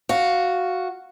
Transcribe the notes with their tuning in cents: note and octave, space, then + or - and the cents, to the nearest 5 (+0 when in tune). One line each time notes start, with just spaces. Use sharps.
F#4 +0 F5 +0